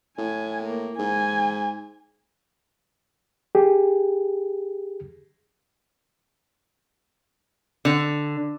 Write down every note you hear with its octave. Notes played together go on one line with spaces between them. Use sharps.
A2 G#5
A#3
G#2 G#5
G4 G#4
D3